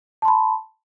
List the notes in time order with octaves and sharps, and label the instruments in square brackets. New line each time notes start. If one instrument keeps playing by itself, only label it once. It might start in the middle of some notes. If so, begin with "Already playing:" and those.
[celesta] A5
C6
B5